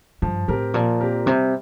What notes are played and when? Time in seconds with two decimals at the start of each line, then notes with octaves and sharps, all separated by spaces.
0.22 G2 F3
0.48 A2 C4 G4 A#4
0.74 A#2 F3
1.01 C4 G4 A#4
1.26 C3 G3